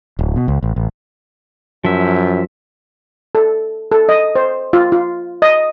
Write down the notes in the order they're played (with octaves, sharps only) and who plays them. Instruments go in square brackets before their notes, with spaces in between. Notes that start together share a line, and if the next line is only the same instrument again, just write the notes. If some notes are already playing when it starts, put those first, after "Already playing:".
[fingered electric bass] D1
B2
C#2
A1
A1
[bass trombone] F#2 [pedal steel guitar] F3 E5
[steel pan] A4
A4
D#5
C5
F4
F4
D#5